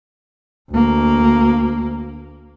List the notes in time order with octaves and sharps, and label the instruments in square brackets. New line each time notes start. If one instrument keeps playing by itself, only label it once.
[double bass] D2 A#3